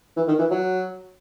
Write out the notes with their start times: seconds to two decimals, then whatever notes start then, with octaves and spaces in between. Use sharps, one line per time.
0.16 E3
0.28 D#3
0.39 E3
0.51 F#3